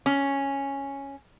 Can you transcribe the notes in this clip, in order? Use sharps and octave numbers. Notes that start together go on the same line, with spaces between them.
C#4